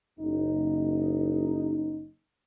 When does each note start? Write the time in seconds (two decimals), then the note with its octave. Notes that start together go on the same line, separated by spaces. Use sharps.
0.19 F#1 D#4